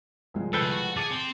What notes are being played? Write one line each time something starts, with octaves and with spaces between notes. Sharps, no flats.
C2 F3 G#3
C#3 C4 A4 B4 G5
F#4
G#4 A5 D6 C#7 D#7
C4